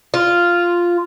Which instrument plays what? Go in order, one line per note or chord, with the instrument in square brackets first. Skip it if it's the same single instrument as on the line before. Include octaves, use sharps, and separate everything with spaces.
[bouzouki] F4